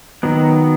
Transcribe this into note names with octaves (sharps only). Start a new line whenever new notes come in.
D#3 F#3 B3